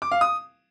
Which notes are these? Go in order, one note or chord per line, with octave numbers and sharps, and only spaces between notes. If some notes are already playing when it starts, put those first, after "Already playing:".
D6
F5
D#6